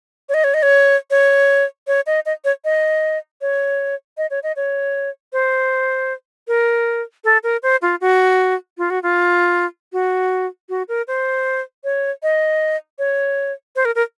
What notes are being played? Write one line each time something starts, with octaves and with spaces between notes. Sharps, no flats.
C#5
D#5
C#5
D#5
C#5
C#5
C#5
D#5
D#5
C#5
D#5
C#5
D#5
C#5
D#5
C#5
C5
A#4
A4
A#4
C5
F4
F#4
F4
F#4
F4
F#4
F#4
A#4
C5
C#5
D#5
C#5
C5
A#4
A#4